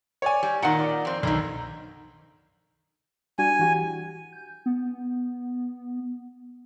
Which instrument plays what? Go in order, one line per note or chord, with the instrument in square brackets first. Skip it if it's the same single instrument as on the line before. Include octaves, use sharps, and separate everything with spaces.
[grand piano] C#5 D5 G#5
[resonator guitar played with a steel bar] G3
[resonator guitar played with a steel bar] A#2 D#3 [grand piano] F#5 A#5
[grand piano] D5
[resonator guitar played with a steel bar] F2 C4
[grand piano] B1 A#5 [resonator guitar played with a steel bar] D3 D#3
[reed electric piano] G3 D4 F#4 [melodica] G#5
[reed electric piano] E3 F#4 G4
[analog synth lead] G6
B3